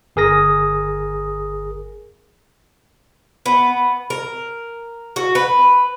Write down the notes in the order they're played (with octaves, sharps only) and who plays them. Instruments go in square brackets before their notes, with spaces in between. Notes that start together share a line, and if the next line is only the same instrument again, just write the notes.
[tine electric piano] G1 G#4 A#4 D#6 A#6
[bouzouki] B3
A#4
F#4
B4